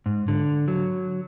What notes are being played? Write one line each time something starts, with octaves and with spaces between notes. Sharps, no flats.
G#2
D3
F#3